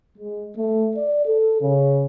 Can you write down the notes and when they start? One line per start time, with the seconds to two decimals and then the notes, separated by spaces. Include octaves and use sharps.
0.18 G#3
0.57 A3
0.96 D5
1.26 A4
1.61 C#3